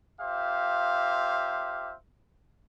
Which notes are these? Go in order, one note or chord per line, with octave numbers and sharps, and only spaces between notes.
A#3 F4 G4 C5 E5 F5